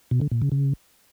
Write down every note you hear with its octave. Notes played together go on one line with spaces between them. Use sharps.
B2
D3
A#2
C#3
C#3